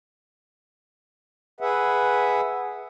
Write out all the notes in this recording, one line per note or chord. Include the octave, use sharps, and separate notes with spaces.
G#4 B4 E5 F#5